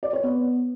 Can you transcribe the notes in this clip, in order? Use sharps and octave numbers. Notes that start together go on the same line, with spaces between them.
D5
C#5
B3